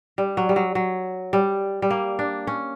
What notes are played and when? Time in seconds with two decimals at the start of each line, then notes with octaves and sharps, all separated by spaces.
0.18 G3
0.37 F#3
0.49 G3
0.56 F#3
0.75 F#3
1.33 G3
1.82 G3
1.90 A#3
2.19 D4
2.47 C#4